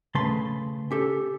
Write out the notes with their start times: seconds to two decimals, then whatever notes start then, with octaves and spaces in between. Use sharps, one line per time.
0.15 C#3 A3 B4 A5 C6
0.91 C#4 G4 A4